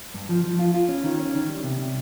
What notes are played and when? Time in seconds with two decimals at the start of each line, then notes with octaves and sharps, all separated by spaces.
0.14 G2
0.29 F3
0.44 F3
0.59 F4
0.74 F4
0.89 C#4
1.04 D#3
1.19 C#4
1.35 D#3
1.49 G3
1.64 C3
1.80 C3